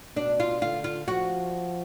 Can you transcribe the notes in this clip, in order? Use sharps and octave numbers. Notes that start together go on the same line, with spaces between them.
B2 D4
F4
D3 F4
F4
F3 F#4